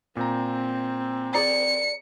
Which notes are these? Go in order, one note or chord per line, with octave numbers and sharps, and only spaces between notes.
A#2 C4 A#5
G#4 D5 A#5 C#7